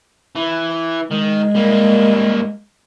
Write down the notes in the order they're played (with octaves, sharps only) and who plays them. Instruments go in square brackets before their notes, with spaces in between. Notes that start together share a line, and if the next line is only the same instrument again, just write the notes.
[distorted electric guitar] E3
[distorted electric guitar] D#3 [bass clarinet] G#3
[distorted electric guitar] G3 A#3